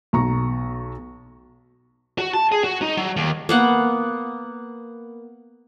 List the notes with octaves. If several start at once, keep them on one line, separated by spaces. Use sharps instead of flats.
B1 A#5 C#6
F#4
A5
G#4
F#4
D#4
F#3
D#2
A#3 B3 F#5